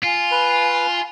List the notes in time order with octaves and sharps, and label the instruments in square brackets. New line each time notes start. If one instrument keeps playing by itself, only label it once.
[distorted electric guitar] F4 [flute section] F5 G#5 C6
[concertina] B4